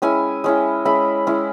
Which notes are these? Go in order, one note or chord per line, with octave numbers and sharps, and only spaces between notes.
G#3 C#4 E4 G#5
G#3 C#4 E4
G#3 C#4 E4 B5
G#3 C#4 E4